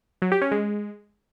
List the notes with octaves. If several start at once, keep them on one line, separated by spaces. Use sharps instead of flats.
F#3
G4
C#4
G#3